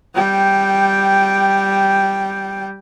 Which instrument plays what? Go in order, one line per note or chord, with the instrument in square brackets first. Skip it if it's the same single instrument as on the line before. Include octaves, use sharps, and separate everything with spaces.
[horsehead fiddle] G3 G5